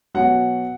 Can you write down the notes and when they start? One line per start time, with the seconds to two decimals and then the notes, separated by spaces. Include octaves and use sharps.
0.14 B2 F#3 F#5